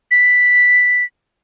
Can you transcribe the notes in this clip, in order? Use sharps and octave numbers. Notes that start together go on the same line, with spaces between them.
B6